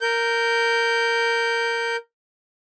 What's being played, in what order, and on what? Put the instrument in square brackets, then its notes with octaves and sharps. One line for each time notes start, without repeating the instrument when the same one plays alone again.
[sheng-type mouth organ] A#4 G6